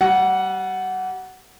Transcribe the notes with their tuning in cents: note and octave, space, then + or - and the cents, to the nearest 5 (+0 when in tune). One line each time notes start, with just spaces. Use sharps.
G3 -30 F#5 +5